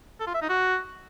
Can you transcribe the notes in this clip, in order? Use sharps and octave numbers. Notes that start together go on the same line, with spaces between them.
A4
F4
E5
D#4
F#4